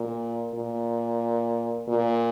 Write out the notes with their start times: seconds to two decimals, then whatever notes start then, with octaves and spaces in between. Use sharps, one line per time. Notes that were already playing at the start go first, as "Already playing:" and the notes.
Already playing: A#2
0.54 A#2
1.88 A#2